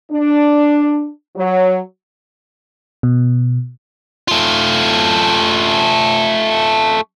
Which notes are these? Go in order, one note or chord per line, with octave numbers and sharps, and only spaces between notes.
D4
F#3
B2
A3 F4